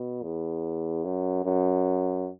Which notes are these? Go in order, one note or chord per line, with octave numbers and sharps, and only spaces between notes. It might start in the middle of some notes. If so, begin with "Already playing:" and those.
Already playing: B2
E2
F#2
F#2